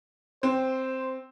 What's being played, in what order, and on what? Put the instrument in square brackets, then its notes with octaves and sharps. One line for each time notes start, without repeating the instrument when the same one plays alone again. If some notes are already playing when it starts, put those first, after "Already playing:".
[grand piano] C4 [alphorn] C5